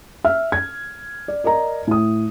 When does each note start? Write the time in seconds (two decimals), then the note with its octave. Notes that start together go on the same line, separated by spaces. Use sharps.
0.24 E5 F6
0.52 G#6
1.28 D5
1.44 A#4 D5 D#5 A#5
1.87 A2 D#6